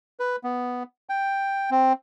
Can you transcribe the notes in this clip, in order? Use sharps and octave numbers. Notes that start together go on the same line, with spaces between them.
B4
B3
G5
C4